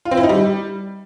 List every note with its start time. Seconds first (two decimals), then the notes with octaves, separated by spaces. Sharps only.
0.05 F4
0.11 C4
0.17 E4
0.23 D#4
0.29 G3